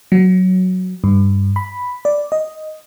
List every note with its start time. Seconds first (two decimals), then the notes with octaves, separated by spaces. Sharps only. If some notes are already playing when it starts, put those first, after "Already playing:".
0.12 F#3
1.04 G2
1.56 B5
2.05 D5
2.32 D#5